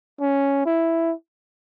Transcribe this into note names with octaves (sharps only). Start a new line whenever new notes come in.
C#4
E4